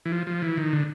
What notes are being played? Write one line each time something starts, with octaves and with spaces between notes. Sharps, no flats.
E3
F3
F3
E3
D#3
D3